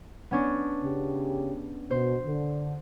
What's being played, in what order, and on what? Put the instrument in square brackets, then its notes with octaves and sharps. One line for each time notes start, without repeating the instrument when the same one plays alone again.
[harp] B3 C#4 D4
[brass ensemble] C#3 G4
[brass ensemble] B2 [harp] C5
[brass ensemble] D3